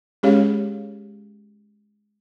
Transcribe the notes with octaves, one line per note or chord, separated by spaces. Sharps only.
G#3 C#4 G4 G#4 C#5 F5